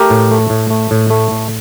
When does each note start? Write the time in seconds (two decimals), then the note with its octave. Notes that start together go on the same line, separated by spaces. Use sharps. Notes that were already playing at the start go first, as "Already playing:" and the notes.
Already playing: A3 G4 A#4
0.10 A2
0.31 A3
0.50 A2
0.70 A3
0.91 A2
1.10 A3
1.31 A2